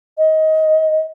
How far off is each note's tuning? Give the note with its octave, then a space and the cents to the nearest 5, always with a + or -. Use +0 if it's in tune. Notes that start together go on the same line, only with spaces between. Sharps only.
D#5 +20